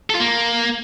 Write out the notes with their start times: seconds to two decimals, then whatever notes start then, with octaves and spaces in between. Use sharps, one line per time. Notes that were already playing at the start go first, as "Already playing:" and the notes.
0.10 A4
0.15 F4
0.20 A#3